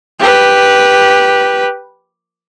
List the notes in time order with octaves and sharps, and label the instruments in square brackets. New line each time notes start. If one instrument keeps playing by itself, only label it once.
[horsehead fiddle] G4 B4